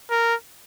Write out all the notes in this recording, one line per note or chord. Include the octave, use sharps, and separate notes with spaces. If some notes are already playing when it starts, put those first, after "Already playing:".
A#4